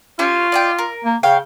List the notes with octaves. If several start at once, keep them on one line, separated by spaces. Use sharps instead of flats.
C#4 F4 G4 C#5
D5 D#5 G5
A#4
A#3
C#3 C#5 F5 G5